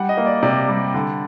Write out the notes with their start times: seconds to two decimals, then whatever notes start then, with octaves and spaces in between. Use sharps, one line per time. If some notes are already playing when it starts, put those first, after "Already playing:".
Already playing: G3 F#5
0.09 D#5
0.17 A#3
0.26 D5
0.43 C3 D5
0.69 G3
0.94 D3